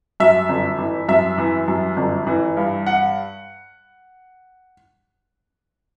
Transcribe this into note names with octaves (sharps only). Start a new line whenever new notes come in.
F#2 E5
G1
E3
F#2 E5
E3
F#2
G1
E3
G2
F#5